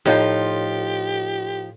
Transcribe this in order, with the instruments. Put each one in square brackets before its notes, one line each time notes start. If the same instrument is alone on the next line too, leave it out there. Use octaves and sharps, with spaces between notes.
[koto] A2 [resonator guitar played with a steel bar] F3 D#4 F4 [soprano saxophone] G4